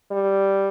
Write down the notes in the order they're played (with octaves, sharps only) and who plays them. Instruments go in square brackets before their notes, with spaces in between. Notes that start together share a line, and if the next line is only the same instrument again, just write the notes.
[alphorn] G3